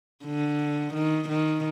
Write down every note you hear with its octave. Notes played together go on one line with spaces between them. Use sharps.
D3
D#3
D#3